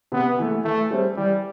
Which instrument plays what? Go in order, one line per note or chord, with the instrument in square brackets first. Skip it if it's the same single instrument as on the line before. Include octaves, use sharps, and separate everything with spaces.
[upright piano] C3 [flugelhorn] B3
[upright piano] E3 A3
[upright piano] E3 [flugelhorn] A3
[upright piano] G3 C4
[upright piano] E3 [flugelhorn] G3